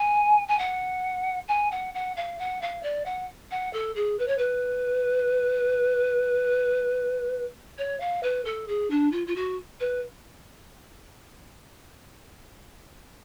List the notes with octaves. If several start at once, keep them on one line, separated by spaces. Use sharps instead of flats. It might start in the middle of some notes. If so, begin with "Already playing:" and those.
Already playing: G#5
G#5
F#5
G#5
F#5
F#5
F5
F#5
F5
D5
F#5
F#5
A4
G#4
B4
C#5
B4
C#5
F5
B4
A4
G#4
D4
F4
F4
F#4
B4